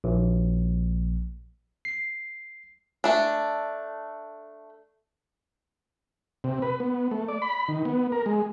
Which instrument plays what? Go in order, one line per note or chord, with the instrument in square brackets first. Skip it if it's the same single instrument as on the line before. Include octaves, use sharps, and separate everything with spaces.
[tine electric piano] A#1
C7
[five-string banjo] A3 D4
[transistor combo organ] C3
B4
B3
A3
D5
B5
D#3
B3
A#4
G#3